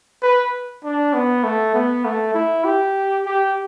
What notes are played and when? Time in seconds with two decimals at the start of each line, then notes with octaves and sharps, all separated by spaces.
0.22 B4
0.84 D4
1.14 B3
1.44 A3
1.75 B3
2.05 A3
2.34 E4
2.65 G4
3.26 G4